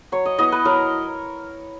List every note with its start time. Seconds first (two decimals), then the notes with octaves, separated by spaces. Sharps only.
0.12 F#3 C#5
0.25 D#5
0.39 B3 E4 D#5
0.52 B4
0.65 F#3 A#4